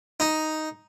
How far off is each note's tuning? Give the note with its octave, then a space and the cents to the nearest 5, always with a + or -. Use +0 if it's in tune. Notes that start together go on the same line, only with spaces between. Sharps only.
D#4 +5